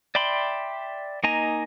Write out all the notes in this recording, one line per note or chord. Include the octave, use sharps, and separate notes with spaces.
D5 E5 G5 B5 C6
A#3 D#4 D#5 G#5 A#5